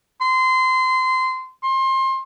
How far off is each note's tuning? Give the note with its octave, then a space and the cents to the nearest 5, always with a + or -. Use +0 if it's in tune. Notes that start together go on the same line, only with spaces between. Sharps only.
C6 -20
C6 +25